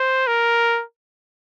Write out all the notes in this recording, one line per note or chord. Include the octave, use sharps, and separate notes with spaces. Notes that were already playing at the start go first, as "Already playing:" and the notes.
Already playing: C5
A#4